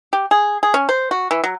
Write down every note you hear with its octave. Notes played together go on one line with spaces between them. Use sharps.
G4
G#4
G#4
C#4
C5
F#4
E3
F#3